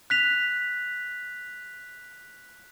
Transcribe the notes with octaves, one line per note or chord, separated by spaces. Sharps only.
F#6 B6 F7